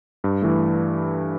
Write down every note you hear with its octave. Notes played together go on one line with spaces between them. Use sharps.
G2
E3 A3